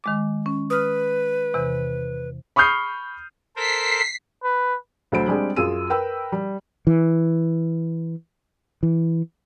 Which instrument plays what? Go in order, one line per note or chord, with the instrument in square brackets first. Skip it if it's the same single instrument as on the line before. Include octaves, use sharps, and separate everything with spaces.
[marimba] D#3 G#3 D6
C#4
[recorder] B4 [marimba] D#6 F6
[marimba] E2 C3 E3
[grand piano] B5 C#6 D#6 F6 G6 C7
[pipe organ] A4 A#4 C5 [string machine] B6 C7
[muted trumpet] B4
[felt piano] D2 F#3 A4 C5 B5 D7
G3 G#3 C4 D4 G#4
F#2 F4 G#4 E6 D#7
A#4 B4 G5 B5 E6
G3
[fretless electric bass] E3
E3